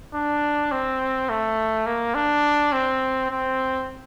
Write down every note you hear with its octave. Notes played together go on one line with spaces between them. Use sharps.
D4
C4
A3
A#3
D4
C4
C4